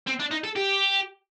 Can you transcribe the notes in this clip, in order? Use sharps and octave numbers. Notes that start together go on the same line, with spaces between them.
C4
D4
D#4
A4
G4